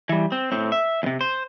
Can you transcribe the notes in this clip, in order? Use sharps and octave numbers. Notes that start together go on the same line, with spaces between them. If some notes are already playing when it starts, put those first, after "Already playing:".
E3 G3
C4
A2 C4
E5
E2 C3
C5